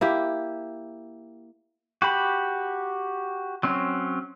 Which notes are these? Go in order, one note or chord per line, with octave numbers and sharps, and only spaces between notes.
A#3 E4 G4
F#4 G4 B5
F#3 C4 C#4